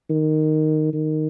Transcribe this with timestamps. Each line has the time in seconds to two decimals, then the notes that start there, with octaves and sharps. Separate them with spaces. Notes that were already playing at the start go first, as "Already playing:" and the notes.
0.10 D#3
0.93 D#3